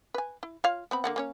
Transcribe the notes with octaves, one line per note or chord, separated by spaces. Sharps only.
B4 G#5
E4
F4 C#5 F5
B3 C4 B5
D3 A#3 F#5
A#3 C#4 C#5